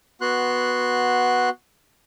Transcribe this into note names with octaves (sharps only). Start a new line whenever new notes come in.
B3 F#4 C6 F#6